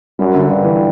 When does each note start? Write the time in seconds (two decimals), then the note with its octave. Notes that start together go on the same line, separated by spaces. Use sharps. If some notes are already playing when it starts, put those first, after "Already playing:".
0.19 F#2 G3
0.34 D3
0.49 G2 D3
0.64 E3